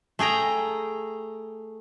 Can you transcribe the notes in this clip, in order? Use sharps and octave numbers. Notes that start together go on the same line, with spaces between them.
A3 G#4 G5 A#5